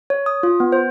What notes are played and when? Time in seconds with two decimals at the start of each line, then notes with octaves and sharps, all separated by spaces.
0.10 C#5
0.26 D#6
0.43 F4
0.60 B3
0.72 C5